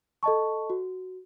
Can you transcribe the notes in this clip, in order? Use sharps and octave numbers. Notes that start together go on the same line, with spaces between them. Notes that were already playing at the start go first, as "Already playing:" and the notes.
A4 D#5 A5 C#6
F#4